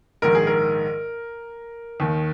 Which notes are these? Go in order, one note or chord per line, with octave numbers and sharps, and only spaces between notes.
A#1 G#2 D#3 A#4
G#4
A#4
D#2 D#3